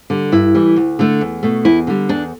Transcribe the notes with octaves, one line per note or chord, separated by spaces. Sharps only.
D3 G3
G2 E4
E3 G3
D2
D3 A3
E2
B2 A3
E2 E4
D3 G3
E2 D4